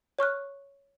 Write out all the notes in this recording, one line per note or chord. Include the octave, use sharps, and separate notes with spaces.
C#5 C#6 F6 F#6